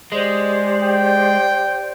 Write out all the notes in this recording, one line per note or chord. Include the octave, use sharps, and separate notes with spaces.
G#3 G4 C5 D5
G5